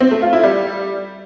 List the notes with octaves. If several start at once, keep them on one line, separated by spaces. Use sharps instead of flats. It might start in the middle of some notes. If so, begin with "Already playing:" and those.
C4
A3
F4
E4
G3